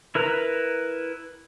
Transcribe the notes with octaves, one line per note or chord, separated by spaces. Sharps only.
E4 A#4 B4 A#5